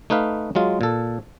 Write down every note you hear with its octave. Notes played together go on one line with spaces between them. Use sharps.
A3 D#4 B4 F5
F#3 G#3 F4
A#2 A4